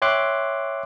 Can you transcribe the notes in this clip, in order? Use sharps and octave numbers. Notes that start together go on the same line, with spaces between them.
C#5 E5 G5 C6 D6 F#6